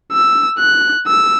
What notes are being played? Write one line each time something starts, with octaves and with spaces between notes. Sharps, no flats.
E6
F#6
E6